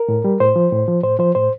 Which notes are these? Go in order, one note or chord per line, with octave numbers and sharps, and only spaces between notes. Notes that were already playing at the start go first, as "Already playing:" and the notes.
Already playing: A#4
A2
G3
A2 C5
F3
A2
F3
A2 C5
F3 C5
A2 C5